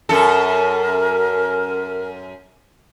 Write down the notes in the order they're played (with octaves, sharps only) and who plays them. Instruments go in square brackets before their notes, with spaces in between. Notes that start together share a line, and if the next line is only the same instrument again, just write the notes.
[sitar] F#2 A4 [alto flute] A#4